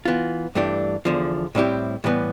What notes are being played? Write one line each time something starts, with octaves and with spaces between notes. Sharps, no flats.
E3 B3 F4
G2 E3 A3 D4 G4
E2 D3 F3
A2 G3 C4 E4 G4
A2 E3 G3 B3